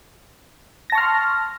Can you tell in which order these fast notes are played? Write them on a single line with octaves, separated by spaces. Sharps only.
A#6 A5 C#6 F6 C6